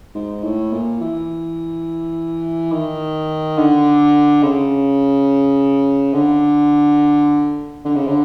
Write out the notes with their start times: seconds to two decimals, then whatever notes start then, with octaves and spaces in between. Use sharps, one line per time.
0.15 G#2
0.44 A2
0.73 A#2
1.01 E3
2.72 D#3
3.58 D3
4.43 C#3
6.14 D3
7.85 D3
7.96 C#3
8.07 D3